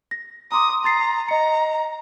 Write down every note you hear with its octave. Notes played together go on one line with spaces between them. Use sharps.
A#6
A#5 C6 D6 D#6
A#5 C6 A6 C7
D#5 A#5 C#7